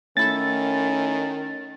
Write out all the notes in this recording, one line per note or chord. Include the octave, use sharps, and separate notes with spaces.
D#3 A3 C#4 E4 A4 A6